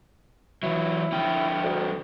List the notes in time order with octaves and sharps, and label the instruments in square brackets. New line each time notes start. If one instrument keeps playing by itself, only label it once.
[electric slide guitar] E3 F#3 [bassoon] E4
[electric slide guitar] D3 F3 G5
[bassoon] D2